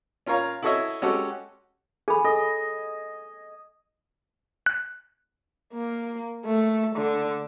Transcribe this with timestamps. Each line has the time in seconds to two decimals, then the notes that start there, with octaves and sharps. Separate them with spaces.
0.27 C#4 F4 A#4 C#5 F5 A#5
0.63 E4 F#4 A4 C#5 D#5 E5
1.02 G#3 C#4 F#4 G4 A4
2.08 G#4 A4 G#5 B5
2.24 A4 D#5
4.66 F#6
5.73 A#3
6.45 A3
6.96 D3